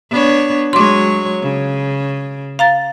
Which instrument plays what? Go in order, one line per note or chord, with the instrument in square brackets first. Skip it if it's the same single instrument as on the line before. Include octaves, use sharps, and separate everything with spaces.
[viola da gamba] B3 D4 C#5
[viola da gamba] F#3 G#3 C#5 [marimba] C6 D6
[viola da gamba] C#3
[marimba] F5 A#5 A6